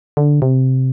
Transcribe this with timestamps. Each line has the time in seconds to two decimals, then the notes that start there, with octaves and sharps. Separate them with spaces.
0.17 D3
0.42 C3